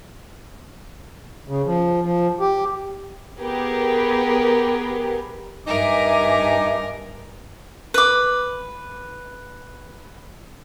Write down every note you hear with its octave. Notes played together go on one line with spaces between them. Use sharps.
C#3
F3
F3
G4
B3 G4 G#4 A#4 B4
G2 D#4 A#4 E5 G#5 D6
B4 D6